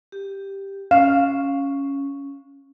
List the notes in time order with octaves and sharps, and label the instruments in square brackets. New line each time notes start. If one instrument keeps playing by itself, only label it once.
[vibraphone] G4
[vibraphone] C#4 [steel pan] F5